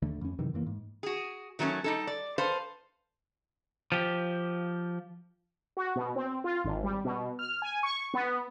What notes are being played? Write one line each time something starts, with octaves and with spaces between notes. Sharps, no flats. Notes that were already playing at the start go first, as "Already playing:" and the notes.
D#2 D3 A3
F2 C#4
F#2 C3 D#3 E3
F#2 E3 A#3
G#2
F#4 G#4
D#3 F#3 A3 C4 C#4
G3 D#4 A4
D5
A4 B4 C5 F5
F3 G4
F#4
B2
C4
F4
G#1
G3
B2
F6
G#5
C#6
B3